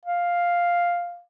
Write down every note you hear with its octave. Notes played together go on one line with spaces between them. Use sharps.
F5